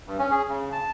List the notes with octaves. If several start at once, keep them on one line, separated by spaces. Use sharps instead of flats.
G2
C#4
G#4
C#3
A5